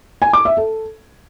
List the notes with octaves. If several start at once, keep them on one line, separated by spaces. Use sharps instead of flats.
G#5
D6
E5
A4